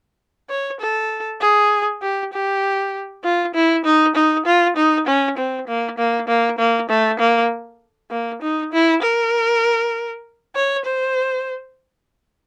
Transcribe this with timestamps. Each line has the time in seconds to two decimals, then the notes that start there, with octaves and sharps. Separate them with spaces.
0.50 C#5
0.81 A4
1.41 G#4
2.02 G4
2.33 G4
3.24 F4
3.54 E4
3.85 D#4
4.15 D#4
4.46 F4
4.76 D#4
5.07 C#4
5.38 C4
5.68 A#3
5.98 A#3
6.28 A#3
6.58 A#3
6.90 A3
7.19 A#3
8.11 A#3
8.42 D#4
8.73 E4
9.02 A#4
10.55 C#5
10.85 C5